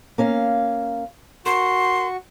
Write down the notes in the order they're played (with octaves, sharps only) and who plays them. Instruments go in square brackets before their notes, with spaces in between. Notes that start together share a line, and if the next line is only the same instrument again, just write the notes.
[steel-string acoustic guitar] A#3 C#4 F5
[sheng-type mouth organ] F#4 C#6 [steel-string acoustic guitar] A#4 [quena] C6